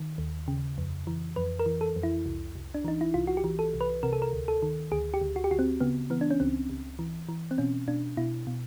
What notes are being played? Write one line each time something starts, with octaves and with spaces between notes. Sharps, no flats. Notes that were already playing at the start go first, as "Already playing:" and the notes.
Already playing: D#3
D#2
C#3
F2
E3
F2 B4
A#4
E3
A4
F2
E4
C2
C2
D4
E3 D#4
E4
C2 F4
F#4
G4
E3
A4
C2
B4
C3 A#4
A4
A#4
D2
A4
D#3
D2 G#4
G4
D2
F#4
G4
D2 F#4
C4
C#3 B3
E3 B3
D4
C#4
C#2 C4
C#2
E3
E3
C4
B2 C#4
B2 D4
B2 E4
B2